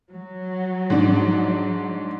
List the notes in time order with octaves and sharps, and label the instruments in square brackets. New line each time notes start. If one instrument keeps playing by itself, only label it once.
[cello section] F#3
[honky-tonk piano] G#2 D4